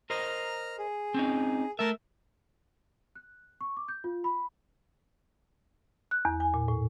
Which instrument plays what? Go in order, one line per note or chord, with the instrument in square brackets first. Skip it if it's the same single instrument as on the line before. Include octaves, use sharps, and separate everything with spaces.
[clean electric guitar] A#4 C5 D#5 [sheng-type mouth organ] A#5 F6
[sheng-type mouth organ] G#4
[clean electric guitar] C4 C#4 D#4
[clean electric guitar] A3 E5 [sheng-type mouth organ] A#4 A5
[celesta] F#6
C#6
D6
G6
F4
B5
[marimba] F#6
E2
G#5
A#2
A2